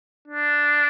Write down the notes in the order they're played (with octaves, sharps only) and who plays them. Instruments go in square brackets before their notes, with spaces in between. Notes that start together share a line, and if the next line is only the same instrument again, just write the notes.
[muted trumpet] D4